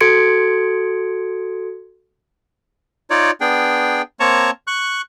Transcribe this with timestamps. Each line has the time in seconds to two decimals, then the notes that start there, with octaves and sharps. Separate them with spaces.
0.01 F#4 A4 C6 G#6 C#7 D7
3.10 D#4 F4 C#5 D5
3.41 B3 D4 G#4 G5
4.20 A#3 C4 C#5 A5 A#5 C#6
4.67 C#6 F#6